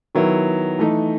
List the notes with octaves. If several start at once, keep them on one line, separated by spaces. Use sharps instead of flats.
D#3 F#3 B3 E4
E3 A3 D#4